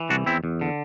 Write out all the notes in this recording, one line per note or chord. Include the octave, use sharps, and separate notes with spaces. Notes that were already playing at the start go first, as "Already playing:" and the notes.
Already playing: E3
C2 D4 F#4
E2 C4 E4
E2
D3